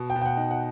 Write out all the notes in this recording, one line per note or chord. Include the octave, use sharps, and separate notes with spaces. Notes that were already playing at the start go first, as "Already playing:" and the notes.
Already playing: B2
G5
B2
G5
F#5
D#4
F#5